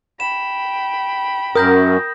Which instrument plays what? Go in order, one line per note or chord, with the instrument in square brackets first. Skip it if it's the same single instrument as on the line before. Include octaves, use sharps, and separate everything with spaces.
[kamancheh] G5 B5 [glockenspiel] E7
[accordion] F#2 [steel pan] A#4 [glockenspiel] D#6 G6 A#6